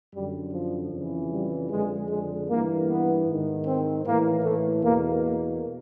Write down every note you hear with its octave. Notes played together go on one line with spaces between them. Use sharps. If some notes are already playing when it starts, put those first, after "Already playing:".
F#2 D3 G3
F3
F2 C#3 E3
G3
F2 D3 G#3
G#3
G2 E3 A#3
B3
G#2 D#3
C4
A2 E3 A#3
A3
E2 B2 A#3
A#3